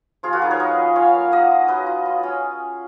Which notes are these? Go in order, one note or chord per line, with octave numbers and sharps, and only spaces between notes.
F3 F4 G#4
F#4 A#4
D#4 G#4 B4
A#4 C#5
F4 B4 D#5
C#4
F4 C#5 F5
A#3
A#3 D#5 F#5
F4
F#3 B4 D#5
F4
F4
C#4